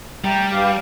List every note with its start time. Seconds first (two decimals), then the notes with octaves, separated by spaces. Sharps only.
0.24 G3 A3 G5 A#5
0.51 G2 G4 F5